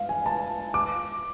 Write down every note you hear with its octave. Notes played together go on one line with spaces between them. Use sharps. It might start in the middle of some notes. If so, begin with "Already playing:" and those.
Already playing: F5
G#5
A5
D6